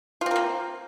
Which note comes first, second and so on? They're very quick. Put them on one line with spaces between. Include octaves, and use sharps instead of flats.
F4 C4 A#4 A#3